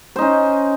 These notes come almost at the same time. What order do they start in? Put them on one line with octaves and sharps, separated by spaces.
C5 D#4 C#4